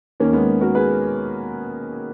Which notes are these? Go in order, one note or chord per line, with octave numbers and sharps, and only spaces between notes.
D#2 D#3 A#3 C#4
G#3 B3
F#4 A#4
G#4 B4